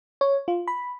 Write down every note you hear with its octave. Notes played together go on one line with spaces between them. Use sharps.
C#5
F4
B5